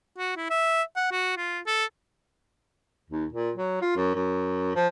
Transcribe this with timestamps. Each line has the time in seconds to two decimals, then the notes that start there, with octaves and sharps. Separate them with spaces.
0.18 F#4
0.36 E4
0.50 E5
0.96 F#5
1.11 F#4
1.37 F4
1.67 A4
3.10 D#2
3.32 A#2
3.56 F#3
3.81 F4
3.96 F#2
4.15 F#2
4.76 F3